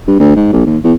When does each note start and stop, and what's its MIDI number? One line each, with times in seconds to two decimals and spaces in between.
0.08 0.15 43
0.19 0.35 38
0.36 0.51 44
0.52 0.62 34
0.66 0.77 39
0.84 0.93 40